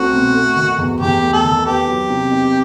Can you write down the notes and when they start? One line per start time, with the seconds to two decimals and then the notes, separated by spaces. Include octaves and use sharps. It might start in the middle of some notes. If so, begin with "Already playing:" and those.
Already playing: C2 A3 C4 F#4
0.13 B2
0.34 A3
0.56 D#3
0.78 E2
1.00 E2 G4
1.22 A3
1.33 A4
1.44 D#3
1.66 B3 G4
1.87 F#3
2.09 C3
2.31 D#4